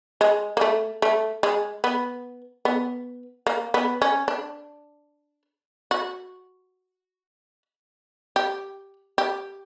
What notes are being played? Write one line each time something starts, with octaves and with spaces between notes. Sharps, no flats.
G#3
A#3
A3
A3
G#3
B3
B3
A#3
B3
C#4
D4
F#4
G4
G4